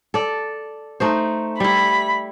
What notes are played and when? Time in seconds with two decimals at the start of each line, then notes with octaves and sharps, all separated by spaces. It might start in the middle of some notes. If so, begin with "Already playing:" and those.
0.14 A4 D5
1.00 A3 D#4 C5
1.60 G3 E4 B5